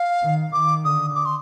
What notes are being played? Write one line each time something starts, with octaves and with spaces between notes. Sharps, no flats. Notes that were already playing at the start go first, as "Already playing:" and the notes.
Already playing: F5
D#3
D#3 D6
D3 D#6
D6
C6